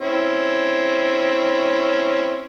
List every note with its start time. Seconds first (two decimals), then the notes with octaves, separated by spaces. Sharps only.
0.01 C4 C#4 E4